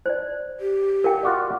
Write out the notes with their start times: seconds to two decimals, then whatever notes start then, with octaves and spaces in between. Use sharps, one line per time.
0.06 C5 D5
0.60 G4
1.04 A#4 F5 G5
1.23 F4 F#4 D5